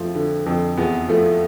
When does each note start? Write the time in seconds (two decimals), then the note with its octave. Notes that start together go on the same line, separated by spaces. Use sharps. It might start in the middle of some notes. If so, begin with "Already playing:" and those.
Already playing: F2 F3 A3
0.15 D3
0.46 F2
0.77 E2 B3
1.08 F3 A3